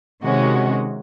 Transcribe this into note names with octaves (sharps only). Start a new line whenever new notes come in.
C3 D#3 G#3 C#4 F#4